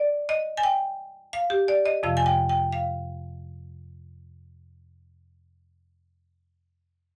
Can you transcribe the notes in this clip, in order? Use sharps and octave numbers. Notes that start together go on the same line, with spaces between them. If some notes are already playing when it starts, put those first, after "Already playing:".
Already playing: D5
D#5
G#5
G5
F5
G4
D5
D#5
F2 C3 F3 F5
G#5
G5
G5
F5